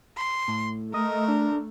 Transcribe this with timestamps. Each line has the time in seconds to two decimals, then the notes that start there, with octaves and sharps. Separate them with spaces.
0.17 C6
0.48 A2
0.94 A3 A#4 D#5
1.28 D4